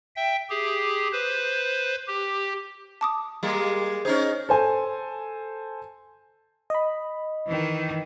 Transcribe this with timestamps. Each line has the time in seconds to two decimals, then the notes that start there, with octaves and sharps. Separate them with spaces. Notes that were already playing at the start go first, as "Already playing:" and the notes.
0.16 E5 G5
0.50 G4 G#4
1.12 B4 C5
2.07 G4
3.01 A5 D6 D#6
3.43 G3 G#3 A#3
4.05 C#4 D#4 G#4 C5
4.49 A4 C5 G#5
6.70 D#5 B5
7.47 D#3 E3